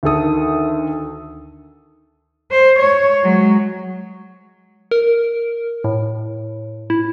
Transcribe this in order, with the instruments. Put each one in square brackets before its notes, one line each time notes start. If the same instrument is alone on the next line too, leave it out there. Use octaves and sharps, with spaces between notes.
[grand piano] D2 D#3 A4 D#6
[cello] C5
C#5
F#3 G#3
[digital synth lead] A#4
A2
E4